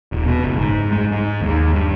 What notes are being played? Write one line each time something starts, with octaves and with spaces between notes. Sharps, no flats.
D#1
B2
F#1
G#2
G#2
G#2
D#2
G2